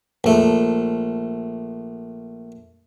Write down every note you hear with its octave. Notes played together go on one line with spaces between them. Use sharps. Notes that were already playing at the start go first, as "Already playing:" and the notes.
A#1 A3